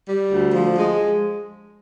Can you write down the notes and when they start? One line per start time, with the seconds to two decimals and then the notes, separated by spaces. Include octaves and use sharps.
0.09 G3
0.32 D2
0.55 F3
0.78 G#3